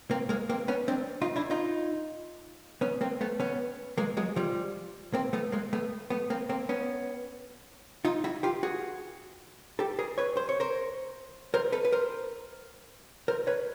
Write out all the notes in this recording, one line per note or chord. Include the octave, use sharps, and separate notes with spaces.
A#3 C4
G#3 A#3
A#3 C4
B3 C#4
C4 D4
D#4 F4
D4 E4
D#4 F4
B3 C#4
A#3 C4
A3 B3
B3 C#4
G#3 A#3
F#3 G#3
F3 G3
A#3 C4
A3 B3
G#3 A#3
A3 B3
A3 B3
A#3 C4
A#3 C4
B3 C#4
D#4 F4
E4 F#4
F4 G4
F#4 G#4
G4 A4
G#4 A#4
B4 C#5
C5
C#5
A#4 C5
A#4 C5
A4 B4
B4
A#4 C5
A#4 C5
B4 C#5